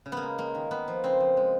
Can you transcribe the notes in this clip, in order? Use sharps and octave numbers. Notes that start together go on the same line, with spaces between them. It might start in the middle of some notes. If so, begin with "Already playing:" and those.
C#3
A#3 B3
G#3
G#3 A#3
D#3
A#3 B3
F3
C#3 C4
F3
G#3